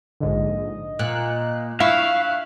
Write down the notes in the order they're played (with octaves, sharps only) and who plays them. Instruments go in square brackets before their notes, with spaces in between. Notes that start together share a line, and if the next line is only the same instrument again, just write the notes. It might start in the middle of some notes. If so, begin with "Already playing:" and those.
[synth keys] A#1 G#2 D3 [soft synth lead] D#5
[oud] A#2 [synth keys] F#6
[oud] E4 [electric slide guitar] F5 [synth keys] C#6 E6 B6 [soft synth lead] F#6